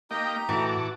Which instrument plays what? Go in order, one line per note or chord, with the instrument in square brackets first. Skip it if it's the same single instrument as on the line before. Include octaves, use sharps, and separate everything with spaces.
[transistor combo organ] A#3 D#5 G5 [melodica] D#4 G4 A#5
[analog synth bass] A2 [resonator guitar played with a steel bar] E3 [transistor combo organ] F#4 A5 D6